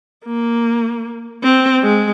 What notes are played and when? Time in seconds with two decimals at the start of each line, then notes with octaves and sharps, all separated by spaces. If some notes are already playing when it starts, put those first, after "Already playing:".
0.25 A#3
1.43 C4
1.83 G#3